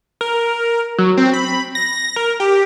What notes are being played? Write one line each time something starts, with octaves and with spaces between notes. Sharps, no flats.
A#4
F#3
C4
B5
A#6
A#4
G4